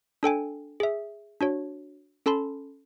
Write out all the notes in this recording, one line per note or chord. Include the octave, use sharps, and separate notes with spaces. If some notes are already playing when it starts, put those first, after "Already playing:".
D4 A4 G5 G#5
G#4 E5
D4 F#4 C#5
C#4 A4 A5 B5 C6